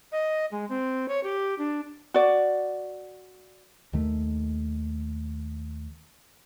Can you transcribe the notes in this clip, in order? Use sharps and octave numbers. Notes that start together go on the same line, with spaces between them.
D#5
G#3
C4
C#5
G4
D4
F#4 D5
D#2 D#3 A3